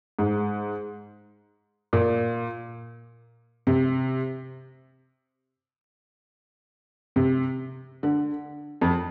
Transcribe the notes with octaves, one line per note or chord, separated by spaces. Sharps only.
G#2
A#2
C3
C3
D3
F2